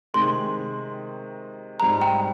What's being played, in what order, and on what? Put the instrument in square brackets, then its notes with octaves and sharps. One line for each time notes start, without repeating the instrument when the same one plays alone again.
[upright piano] C3 D#3 G#3 D#4 [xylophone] C6
[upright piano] G#2 G3 C4 [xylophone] A#5
[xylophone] G5